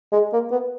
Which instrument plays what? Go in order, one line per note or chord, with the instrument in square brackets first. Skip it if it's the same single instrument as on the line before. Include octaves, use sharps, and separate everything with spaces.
[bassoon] G#3
A#3
B3